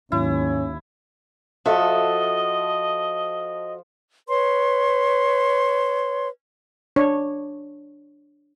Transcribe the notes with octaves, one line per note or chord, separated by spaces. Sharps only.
D#2 G#2 D#3 F#3 C#4 E4
F3 F#4 A4 D#5 E5
B4 C#5 C6
D4 C#5